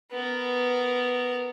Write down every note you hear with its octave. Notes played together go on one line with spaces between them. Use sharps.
B3 A#4